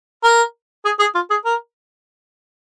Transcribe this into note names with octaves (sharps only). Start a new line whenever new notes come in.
A#4
G#4
G#4
F4
G#4
A#4